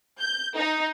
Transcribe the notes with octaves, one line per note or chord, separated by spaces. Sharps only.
G6
D#4